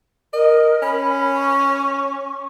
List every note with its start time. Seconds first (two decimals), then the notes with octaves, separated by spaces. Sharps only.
0.33 A#4 D#5
0.82 C#4 B5
1.36 C#6